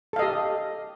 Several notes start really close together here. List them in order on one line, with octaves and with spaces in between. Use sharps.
A4 F5 D#5 G4